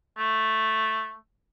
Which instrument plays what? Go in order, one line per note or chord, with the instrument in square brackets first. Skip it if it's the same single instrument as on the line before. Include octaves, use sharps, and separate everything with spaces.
[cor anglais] A3